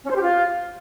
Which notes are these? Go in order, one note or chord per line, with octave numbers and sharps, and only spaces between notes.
C#4
C5
G4
F4